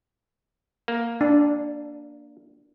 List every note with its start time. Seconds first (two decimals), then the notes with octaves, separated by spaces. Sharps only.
0.88 A#3
1.21 D4